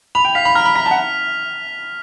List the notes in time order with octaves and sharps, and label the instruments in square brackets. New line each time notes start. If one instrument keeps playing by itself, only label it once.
[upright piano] B5 [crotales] F7
[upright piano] G5
[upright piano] F5 [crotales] B6
[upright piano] B5
[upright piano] A#5 [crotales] F6
[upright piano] B5
[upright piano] A#5 [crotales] B6
[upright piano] A5
F#5